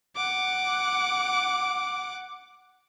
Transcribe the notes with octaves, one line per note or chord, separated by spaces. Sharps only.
F#5 D6